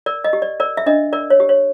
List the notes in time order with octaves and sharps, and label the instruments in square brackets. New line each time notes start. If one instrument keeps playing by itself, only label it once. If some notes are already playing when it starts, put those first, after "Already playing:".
[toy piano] A#4 D5
D#5
G4
D5
A#4 D5
E5
D4 D#5
A#4 D5
C#5
G4
C#5